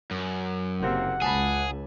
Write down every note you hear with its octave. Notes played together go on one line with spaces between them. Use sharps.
F#2
F#1 C3 A#3 C4 F#5
C#2 G#4 G#5 A5 B5